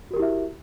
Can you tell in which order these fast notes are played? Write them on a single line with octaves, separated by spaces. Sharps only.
F#4 A#4 G4 E4 E5